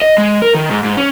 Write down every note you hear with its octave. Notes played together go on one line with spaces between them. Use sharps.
D#5
G#3
A#4
D#3
G#2
G#2
C#4